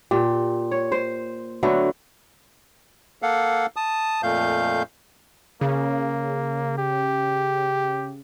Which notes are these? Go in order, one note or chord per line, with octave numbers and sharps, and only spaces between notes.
A#2 G4
C#5
C5
D3 F#3 A3 B3
A#3 A4 F5 F#5
A5 D#6
F2 A#2 A3 F5 G6
C#3 A#3
G4